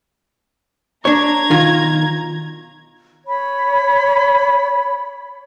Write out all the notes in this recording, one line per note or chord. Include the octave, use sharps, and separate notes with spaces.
D4 C#5 A#5 G#6
B1 D#3 F4
C#5 B5